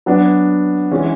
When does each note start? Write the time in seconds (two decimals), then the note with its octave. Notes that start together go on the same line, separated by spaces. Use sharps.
0.06 F#3 B3 D4
0.91 E3 G#3 C#4 F#4